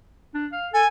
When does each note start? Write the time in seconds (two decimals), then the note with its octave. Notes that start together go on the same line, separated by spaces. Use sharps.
0.34 D4
0.53 F5
0.73 A4 G#5